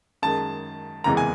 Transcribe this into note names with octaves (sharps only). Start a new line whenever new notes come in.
F#2 D#3 G#3 A5
F#1 E2 C3 E3 G#3 A#5
G#5